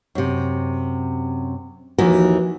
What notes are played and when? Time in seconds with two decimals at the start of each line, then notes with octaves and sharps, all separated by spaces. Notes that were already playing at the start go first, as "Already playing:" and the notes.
0.15 F#2 C3
1.98 D#2 E3 F3 D#4 F#4